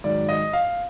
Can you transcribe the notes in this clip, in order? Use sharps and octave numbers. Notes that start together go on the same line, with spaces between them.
G#2 D#3 F#3 D5
D#5
F5